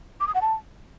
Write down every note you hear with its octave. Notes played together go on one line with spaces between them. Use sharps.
D6
D#6
F#5
A5